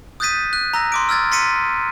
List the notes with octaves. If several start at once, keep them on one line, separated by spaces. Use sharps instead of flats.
D#6 F#6 G6 A6 B6 D#7
F#6
A#5 E6 A#6
C6 D6 D7
E6 F6 G#6 A6
C6 A6 B6 C#7 D#7